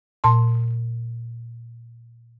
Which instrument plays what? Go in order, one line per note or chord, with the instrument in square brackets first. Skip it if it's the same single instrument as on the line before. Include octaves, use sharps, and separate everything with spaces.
[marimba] A#2 A5 C6